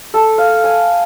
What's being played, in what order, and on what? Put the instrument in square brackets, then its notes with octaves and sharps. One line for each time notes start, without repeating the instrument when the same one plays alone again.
[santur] A4
F5
G#5